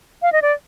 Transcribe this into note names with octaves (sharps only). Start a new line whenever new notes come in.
F5
D#5
D5